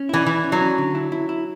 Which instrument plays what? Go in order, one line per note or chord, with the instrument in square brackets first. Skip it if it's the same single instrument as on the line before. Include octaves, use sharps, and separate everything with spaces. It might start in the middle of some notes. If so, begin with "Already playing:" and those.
Already playing: [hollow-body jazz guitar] C#4
[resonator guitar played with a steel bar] E3 [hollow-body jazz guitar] E4
[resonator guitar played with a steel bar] E3 [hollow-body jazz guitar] E4
[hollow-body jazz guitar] C#4
[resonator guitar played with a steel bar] F#3
[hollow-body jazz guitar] C#4
D3
E4
E4
E4